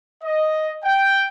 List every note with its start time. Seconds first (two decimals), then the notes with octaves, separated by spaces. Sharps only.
0.24 D#5
0.84 G5